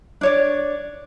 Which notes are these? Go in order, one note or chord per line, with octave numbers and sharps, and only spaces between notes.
D4 C#5 D5